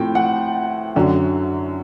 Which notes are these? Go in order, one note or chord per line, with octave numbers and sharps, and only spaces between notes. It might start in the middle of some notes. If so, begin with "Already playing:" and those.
Already playing: A2 F3 A3 C4 G5
F#5
F#2 D3 F#3